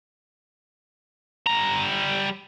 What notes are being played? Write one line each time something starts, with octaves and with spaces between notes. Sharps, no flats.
G3 A#5